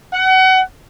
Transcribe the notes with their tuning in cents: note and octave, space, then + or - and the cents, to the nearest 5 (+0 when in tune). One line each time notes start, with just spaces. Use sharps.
F#5 +30